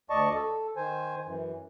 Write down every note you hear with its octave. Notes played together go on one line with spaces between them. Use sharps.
D2 D5 D#5 A5 C#6
A4
D#3 C5 G#5
F#2 E3